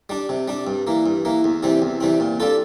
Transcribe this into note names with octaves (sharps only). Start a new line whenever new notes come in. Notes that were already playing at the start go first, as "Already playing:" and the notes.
G3 D4
C3
G3 D4
G2
E3 A#3
G2
E3 A#3
E2
C3 E3 G3 C4
E2
C3 E3 G3 C4
A#2
G3 D4 F4 A4